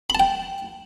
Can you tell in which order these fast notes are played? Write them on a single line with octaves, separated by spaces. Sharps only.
B5 A5 G5